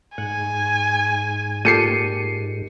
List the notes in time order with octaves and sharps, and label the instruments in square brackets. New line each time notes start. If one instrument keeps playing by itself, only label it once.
[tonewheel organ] G#2 [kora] F#5 [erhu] G#5
[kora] A#2 G4 A4 [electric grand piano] C7 C#7 D#7